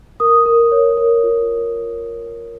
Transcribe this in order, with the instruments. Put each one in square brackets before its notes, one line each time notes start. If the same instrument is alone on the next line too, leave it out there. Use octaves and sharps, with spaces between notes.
[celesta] A#4 D#6
A#4
C#5
A#4
F4